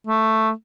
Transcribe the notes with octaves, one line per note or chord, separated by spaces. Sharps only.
A3